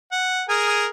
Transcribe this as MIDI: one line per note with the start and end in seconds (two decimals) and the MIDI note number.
0.12 0.43 78
0.49 0.87 68
0.49 0.87 70
0.49 0.87 80